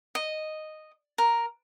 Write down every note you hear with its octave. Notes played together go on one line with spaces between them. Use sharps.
D#5
A#4